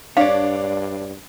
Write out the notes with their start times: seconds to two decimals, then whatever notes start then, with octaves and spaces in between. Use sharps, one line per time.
0.17 G2 D4 C#5 D5 F5